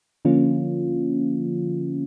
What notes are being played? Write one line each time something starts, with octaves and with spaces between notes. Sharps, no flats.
D3 F3 A#3 C#4 F4